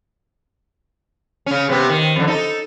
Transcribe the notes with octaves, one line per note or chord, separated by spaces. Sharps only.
C#3 C#4
C3 B3
D#3
F2 D3
D#4 A4